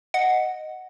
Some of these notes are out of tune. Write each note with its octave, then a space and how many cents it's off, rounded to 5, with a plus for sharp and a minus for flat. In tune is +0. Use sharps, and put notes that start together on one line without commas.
D#5 +0 F#5 +0